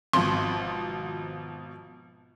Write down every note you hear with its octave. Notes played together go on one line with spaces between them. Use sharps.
G#1 B2 F3 C6